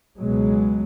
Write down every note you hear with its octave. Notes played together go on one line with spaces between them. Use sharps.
C#2 B2 F#3 G#3